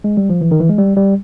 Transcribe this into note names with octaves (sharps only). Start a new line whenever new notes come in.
G#3
G3
F3
E3
D#3
E3
G#3
G3
G3